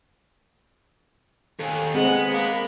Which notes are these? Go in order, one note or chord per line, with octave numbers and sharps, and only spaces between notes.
D#2 A4 G#5
G#3 B3 C4 G#4 D#5 F#5
A#3 B5